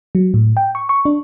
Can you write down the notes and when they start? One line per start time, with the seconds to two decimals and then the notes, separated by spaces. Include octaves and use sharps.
0.15 F#3
0.34 A2
0.57 G5
0.75 C#6
0.89 C#6
1.05 D4